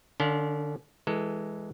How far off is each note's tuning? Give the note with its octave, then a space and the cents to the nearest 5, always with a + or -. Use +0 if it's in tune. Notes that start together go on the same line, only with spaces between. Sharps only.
D3 +25 D4 -45 F5 +10
E3 +0 G#3 +0 A4 +20